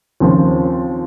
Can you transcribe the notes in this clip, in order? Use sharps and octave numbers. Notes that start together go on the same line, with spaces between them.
D#2 C#3 F3 C4 F4